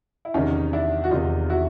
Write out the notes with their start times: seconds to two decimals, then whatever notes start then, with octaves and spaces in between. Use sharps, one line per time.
0.25 E4
0.34 E2 C3 D#3 C#4 D#4
0.73 D4 E4
1.04 F#4
1.11 E2 C3 D#3 D#4 F4
1.50 E4 F#4